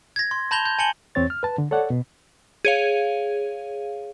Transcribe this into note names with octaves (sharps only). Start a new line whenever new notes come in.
G#6 A#6
C6
A5 B5 G6 A#6 F7 G7
G6
G#5 A5 C#7 F#7 G7
E2 C4 C#5 A6
F6
B4 A5
D3
A4 C#5 D5 F#5
B2
G#4 C#5 F5